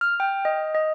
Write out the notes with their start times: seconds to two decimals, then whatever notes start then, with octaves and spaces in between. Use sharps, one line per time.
0.01 F6
0.20 G5
0.45 D#5
0.75 D#5